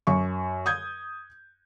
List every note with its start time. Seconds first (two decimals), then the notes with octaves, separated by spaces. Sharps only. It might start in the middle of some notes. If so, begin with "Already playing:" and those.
0.07 F#2 C#6
0.66 D#6 G6 G#6